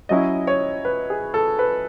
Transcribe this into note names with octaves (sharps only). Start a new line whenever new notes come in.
F#3 C#4 E4 D#5
C#5
B4
G#4
A4
B4